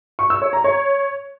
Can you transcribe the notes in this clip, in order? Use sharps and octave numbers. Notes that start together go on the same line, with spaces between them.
C#6
E6
C#5
A#5
C#5